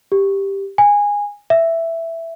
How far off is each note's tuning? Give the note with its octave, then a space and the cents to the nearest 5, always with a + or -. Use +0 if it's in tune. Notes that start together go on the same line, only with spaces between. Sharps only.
G4 +5
G#5 -15
E5 +5